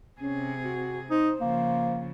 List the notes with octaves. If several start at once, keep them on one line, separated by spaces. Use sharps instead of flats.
C3 C#4 G#4
F#4
D#4 C5
C#3 F3 A#3